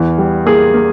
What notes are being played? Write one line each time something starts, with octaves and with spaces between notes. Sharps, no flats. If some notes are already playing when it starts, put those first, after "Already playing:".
Already playing: E2 E3
G3
A#3 G#4
A#3